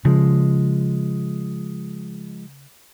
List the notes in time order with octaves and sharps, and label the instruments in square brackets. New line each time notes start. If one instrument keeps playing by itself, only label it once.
[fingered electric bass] C#3 [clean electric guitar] F3 G#3